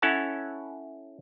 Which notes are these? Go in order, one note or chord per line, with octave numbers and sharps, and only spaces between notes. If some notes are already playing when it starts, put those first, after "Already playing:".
C#4 E4 A4 C#5 F#5 A5